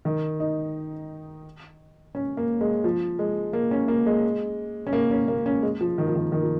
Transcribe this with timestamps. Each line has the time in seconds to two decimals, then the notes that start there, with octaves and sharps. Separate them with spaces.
0.05 D#3
0.40 D#4
2.15 C#4
2.37 A#3
2.61 G#3
2.84 F3
3.19 G#3
3.53 A#3
3.71 C#4
3.88 A#3
4.06 G#3
4.87 C#4
4.93 A#3
5.11 C#4
5.28 A#3
5.46 C#4
5.63 G#3
5.81 F3
5.98 D#3
6.07 F3
6.15 D#3
6.32 D#3
6.43 F3